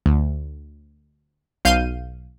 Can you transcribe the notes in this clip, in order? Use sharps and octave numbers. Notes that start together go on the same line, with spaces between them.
D2
B1 F5 G6 C7 D#7